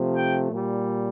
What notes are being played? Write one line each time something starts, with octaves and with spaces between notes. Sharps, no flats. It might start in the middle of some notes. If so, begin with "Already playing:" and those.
Already playing: C3 F3 A3
G5
A#2 G3